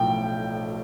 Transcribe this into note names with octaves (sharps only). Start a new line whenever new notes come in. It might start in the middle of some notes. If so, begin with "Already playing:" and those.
Already playing: B1 A2 F3 G5